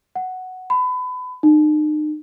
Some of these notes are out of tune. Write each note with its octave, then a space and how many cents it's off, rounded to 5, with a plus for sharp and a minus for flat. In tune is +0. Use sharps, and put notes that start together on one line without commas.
F#5 +5
B5 +30
D#4 -40